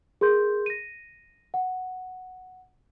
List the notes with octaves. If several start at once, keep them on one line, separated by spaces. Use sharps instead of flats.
G#4 A#4 C6 G6
A#6 D#7
F#5